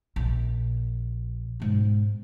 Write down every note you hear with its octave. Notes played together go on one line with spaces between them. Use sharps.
A#1
G#2 B2